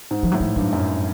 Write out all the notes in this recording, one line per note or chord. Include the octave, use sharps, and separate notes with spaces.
G#2
F3
A2 F#3
F3
G2 F#3
F#2